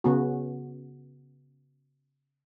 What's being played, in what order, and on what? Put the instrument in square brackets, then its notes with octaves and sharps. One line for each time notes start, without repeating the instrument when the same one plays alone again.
[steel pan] C#3 B3 F#4